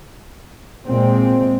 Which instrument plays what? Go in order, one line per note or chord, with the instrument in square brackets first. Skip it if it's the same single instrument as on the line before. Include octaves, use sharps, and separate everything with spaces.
[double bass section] A#2 G#3 C4